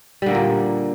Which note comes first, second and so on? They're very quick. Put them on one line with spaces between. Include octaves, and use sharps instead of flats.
G3 D3 A#3 A#2